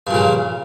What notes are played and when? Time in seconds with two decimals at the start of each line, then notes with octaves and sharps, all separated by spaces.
0.07 G2
0.11 A#2
0.14 C#3